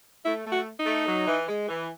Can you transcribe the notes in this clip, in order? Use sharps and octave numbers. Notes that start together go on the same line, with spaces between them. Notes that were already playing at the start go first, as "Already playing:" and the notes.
A3 E4
A3
F#4
D#4
A3
F#3
E3
G#3
E3